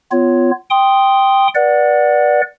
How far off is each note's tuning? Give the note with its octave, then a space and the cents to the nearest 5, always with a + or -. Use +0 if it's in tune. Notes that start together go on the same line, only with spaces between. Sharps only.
B3 +25 F4 -5 C#5 +0
G5 +0 C6 +0 D#6 +0
B4 -35 D5 +5 F#5 +0